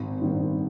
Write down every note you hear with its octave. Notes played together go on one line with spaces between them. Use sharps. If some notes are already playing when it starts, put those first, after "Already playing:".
Already playing: G#1
G2 D#3